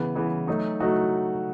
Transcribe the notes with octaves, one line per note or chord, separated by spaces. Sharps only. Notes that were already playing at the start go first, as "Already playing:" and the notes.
Already playing: C#3 E3 B3
C#3 E3 B3
F#3 A3 D#4 F#4
F#3 A3 D#4 F#4